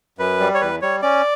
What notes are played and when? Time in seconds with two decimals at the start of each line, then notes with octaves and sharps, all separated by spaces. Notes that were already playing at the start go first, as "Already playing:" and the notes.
0.19 F#2 B4
0.40 G3
0.54 C#5
0.61 E2 B4
0.82 G3 C#5
1.02 C#4 D5